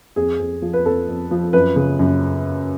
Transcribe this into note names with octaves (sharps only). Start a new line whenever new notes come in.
F2 G#4
F2
F3
B4
F2 A4
F2
F3
F#2 B4
C#3
F#2